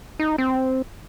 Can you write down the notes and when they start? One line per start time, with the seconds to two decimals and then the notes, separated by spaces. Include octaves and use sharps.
0.19 D#4
0.38 C4